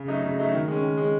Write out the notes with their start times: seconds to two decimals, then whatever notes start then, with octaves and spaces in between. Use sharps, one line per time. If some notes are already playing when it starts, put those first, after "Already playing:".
Already playing: C#3
0.08 F#3 A3 D#4
0.23 C#3
0.38 F#3 A3 D#4
0.53 D#3
0.67 G#3 C#4
0.83 D#3
0.97 G#3 C#4